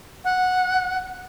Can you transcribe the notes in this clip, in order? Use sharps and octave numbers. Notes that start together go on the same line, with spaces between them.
F#5